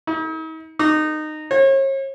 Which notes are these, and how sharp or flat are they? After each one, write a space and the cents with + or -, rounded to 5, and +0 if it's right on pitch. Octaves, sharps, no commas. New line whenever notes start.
D#4 +45
D#4 -20
C#5 -40